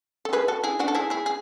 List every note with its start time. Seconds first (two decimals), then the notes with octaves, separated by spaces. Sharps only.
0.25 A4
0.33 G#4 B4
0.48 F#4 A4
0.64 E4 G#4
0.79 D4 F#4
0.88 A4
0.95 E4 G#4
1.10 E4 G#4
1.26 G#4